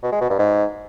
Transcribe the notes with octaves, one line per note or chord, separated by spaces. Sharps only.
B2
G#3
B2
G2
G#2